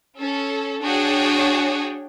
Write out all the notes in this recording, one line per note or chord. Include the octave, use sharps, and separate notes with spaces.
C#4 A4
D4 F#4 G#4 C#5 G5